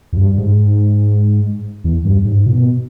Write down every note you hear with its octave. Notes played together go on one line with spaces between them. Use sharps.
E2
G2
G#2
E2
G2
G#2
B2